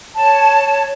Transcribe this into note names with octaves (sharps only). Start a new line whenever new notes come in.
C#5 A5